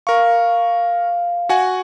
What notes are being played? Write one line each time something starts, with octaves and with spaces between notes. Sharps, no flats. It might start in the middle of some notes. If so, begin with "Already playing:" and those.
A#4 F5 C#6
F#4 F#5 G#5